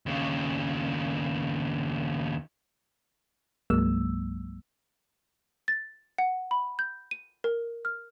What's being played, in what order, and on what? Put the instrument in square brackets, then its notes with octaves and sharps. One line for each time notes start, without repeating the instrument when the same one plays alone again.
[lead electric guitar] D#2 C#3
[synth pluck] C2 G2 F#3 G#3 A#3 E6
[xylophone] A6
F#5
B5
G6
D#7
A#4
F6